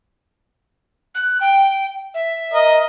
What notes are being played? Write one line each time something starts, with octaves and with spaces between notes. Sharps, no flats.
F#6
G5
E5
A#4 D#5